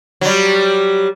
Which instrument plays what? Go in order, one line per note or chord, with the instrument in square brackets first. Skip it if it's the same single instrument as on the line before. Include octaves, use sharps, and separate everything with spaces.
[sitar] F#3 G3